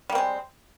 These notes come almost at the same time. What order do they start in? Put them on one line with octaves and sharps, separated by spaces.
G3 A#3 C4 G#3